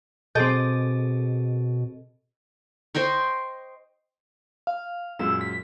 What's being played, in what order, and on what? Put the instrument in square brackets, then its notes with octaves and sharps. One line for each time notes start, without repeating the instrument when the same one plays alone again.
[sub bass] B2 [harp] C4 D6 G6 [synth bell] G#4 A4 D#5
[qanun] C5 D#5 G5 C#6
[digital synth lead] F5
[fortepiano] F#2 A#2 G#3 [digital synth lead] E6
[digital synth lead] B6